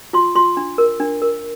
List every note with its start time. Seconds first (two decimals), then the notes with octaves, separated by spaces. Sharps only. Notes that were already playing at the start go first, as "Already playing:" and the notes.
0.13 F4 C6
0.35 F4 C6
0.57 D4
0.78 A#4
1.00 D4
1.22 A#4